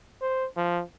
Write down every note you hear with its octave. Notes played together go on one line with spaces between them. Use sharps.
C5
F3